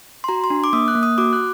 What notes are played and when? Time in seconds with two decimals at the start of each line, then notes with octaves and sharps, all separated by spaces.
0.24 C6
0.28 F#4 A#5
0.44 C6
0.50 D4
0.64 D6
0.73 A#3 D#6
0.88 F#6
0.95 A#3
1.03 D#6
1.18 F#4 D6
1.33 F#6